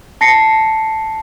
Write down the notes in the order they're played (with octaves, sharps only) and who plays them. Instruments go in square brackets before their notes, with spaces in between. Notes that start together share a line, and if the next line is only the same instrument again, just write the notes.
[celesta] A5 A#6 C7 C#7